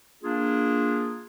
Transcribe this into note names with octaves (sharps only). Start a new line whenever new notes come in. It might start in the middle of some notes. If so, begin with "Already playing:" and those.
A#3 D4 F4 G#4